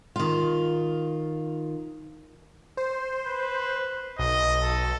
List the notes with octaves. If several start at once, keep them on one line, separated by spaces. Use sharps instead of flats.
D#3 F4
C5
B4
B1 D#5
A4